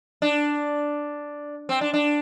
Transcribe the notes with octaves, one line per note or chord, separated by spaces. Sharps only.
D4
C4
D4
D4